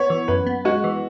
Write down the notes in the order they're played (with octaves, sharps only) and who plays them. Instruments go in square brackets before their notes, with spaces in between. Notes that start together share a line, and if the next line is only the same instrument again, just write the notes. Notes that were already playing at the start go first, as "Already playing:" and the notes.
Already playing: [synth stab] B3 F#4 [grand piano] C#5
[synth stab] E3
[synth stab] F#2 [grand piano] B4
[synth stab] B3
[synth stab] G#3 [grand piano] F#4
[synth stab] E3